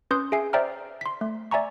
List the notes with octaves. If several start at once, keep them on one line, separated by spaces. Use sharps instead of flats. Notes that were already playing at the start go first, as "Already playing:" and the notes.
C#4 B4 C6 D#6 G6
G#4 E5 G#5 C7
C5 D5 E5 G5 A#5 F6
C6 B6
A3
D5 E5 G#5 A#5 C#6